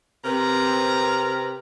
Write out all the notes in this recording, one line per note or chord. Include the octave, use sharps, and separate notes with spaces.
C3 C4 A#4 B4 A#5